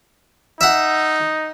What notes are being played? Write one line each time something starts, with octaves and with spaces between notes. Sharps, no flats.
D#4 E5 F#5